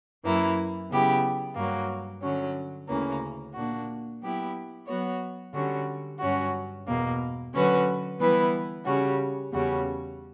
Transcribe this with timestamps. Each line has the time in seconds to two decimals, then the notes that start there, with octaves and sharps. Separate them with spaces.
0.24 F#2 E3 A#3 E4
0.90 C#3 F#3 B3 E4 G4
1.56 G2 F#3 A#3
2.22 D3 F#3 C#4
2.88 D2 C#3 E3 A#3 C#4
3.55 A#2 A#3 D4 F#4
4.21 F#3 B3 E4 G4
4.87 F#3 B3 F#4 C#5
5.54 D3 G3 C#4 F#4
6.20 G2 F#3 C#4 F#4
6.87 E2 B2 A#3
7.54 D3 F#3 C#4 F#4 B4
8.19 E3 G3 B3 E4 B4
8.86 C#3 G3 C#4 F#4
9.52 E2 C#3 G3 C#4 F#4